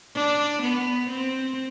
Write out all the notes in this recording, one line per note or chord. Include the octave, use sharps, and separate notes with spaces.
D4
B3
C4